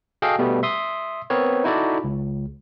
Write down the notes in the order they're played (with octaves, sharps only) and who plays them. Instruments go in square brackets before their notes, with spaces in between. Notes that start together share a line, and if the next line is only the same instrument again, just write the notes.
[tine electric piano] F#4 G#4 A4 D#5 F5 G5
B2 G3 A3 B3
E5 C6 D#6
B3 C4 A#4 C#5
D#4 E4 F#4 A4 D5
C#2